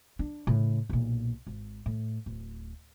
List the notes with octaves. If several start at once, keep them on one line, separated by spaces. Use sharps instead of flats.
D4
A2 C#3
B1 A#2
G#1
A2
D1